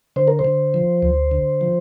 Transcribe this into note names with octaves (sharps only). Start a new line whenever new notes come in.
D3 C5
A#4
C5
D3
F3
D2
D3
F3